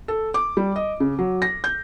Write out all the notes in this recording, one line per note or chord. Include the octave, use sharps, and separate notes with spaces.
A4
D6
G3
D#5
C#3
F#3
A#6
G6